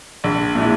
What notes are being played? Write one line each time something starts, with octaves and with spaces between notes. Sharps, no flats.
A#1
A#2 G#3 E4